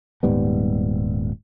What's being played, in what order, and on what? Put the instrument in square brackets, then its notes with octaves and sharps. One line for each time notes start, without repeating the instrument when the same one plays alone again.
[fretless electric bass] D#1 G#2 G3 B3